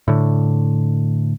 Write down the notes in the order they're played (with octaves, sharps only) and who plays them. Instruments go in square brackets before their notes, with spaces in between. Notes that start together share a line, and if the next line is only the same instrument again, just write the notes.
[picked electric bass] A2 D3